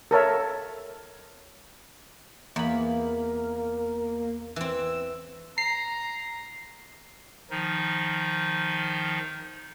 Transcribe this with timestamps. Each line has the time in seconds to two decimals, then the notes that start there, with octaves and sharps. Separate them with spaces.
0.11 A4 A#4 C#5 E5
2.56 E2 A#3 B5
4.56 E3 C4 E6
5.58 A#5 C7
7.51 D#3 F3 D#4